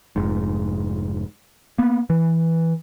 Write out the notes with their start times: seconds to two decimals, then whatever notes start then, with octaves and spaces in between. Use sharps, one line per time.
0.16 F1 G#2
1.78 A#3 B3
2.10 E3